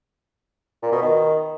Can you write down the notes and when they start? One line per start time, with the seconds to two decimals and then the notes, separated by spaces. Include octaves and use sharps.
0.83 A#2
0.92 B2
1.02 D#3